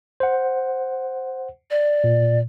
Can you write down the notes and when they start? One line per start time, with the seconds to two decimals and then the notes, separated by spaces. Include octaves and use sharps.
0.20 C5 F#5
1.71 D5
2.04 A#2